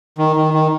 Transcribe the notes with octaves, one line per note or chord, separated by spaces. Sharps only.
D#3
D#3
D#3